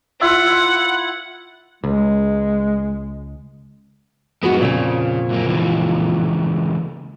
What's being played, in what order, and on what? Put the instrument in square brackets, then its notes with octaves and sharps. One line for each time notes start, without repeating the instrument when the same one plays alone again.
[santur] E4 F4 E5 [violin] F#5
[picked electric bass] C#2 [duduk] G#3
[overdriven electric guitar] F#2 G#3 [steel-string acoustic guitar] B3 D#4 F#4
[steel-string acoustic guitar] F2 A#2 [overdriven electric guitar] C#3
[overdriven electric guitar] F#2 A#3
C#2 E3